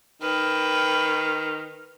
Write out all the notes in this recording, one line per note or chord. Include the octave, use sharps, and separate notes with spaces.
D#3 B4 G5